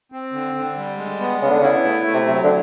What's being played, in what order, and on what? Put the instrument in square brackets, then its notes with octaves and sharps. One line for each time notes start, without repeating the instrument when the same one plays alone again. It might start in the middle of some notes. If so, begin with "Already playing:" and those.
[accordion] C4
D3
D3
G3
G#3
B3
[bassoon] C#3 [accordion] B3
[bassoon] D3
[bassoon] C#3 [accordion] E4
[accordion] A3
A3
[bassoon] C3
[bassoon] C3 [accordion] F#3
[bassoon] D3